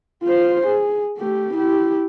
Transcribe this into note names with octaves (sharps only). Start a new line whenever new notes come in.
F4 C5
G#4
A3 G4
E4 G4